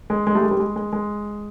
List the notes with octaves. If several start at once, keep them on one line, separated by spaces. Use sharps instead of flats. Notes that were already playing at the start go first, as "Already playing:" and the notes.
G#3
G#3
G3 A3
G#3
G3
G#3
G#3
G#3